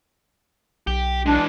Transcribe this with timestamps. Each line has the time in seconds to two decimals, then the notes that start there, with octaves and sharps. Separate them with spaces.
0.87 B1 G4
1.26 E3 G#3 D4